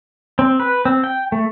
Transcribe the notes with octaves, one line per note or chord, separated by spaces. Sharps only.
C4
B4
C4
G5
A3